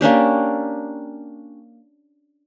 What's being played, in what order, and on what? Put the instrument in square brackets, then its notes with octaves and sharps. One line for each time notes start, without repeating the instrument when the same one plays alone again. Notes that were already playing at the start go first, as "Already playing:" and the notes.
[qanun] A#3 C#4 D4 G4